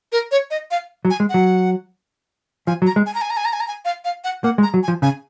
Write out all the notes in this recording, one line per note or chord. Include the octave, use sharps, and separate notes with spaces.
A#4
C#5
D#5
F5
F#3
G#5
G#3
F#3 F#5
F3 G#5
F#3
A#5
G#3
G#5
A#5
G#5
A#5
G#5
A#5
G#5
A#5
G#5
F5
F5
F#5
A#3 F#5
G#3
A#5
F#3
G#5
F3
C#3 G#5